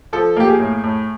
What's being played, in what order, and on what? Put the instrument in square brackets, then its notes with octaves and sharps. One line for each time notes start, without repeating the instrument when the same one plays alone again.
[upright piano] F3 A4
A#3 G4
G#4
A2
A2